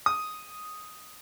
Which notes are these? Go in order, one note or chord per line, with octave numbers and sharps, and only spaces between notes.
D#6